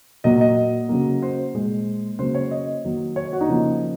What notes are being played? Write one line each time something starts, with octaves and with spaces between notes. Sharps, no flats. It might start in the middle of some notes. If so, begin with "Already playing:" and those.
A#2 F#3 A#3 D#5
D#5
C#3 F#3 A#3
C5
A#2 G#3
C#3 F#3 A#3 C5
C#5
D#5
D#3 F#3 A#3
C#5
F#4
D#4
C#3 F3 A#3